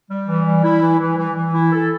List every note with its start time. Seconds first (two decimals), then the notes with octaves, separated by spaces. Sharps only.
0.10 G3
0.27 E3
0.46 G3
0.63 E4
0.81 E3
0.99 E3
1.18 E3
1.35 E3
1.54 E4
1.72 A4